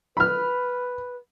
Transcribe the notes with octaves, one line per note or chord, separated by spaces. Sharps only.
B4 B5 F6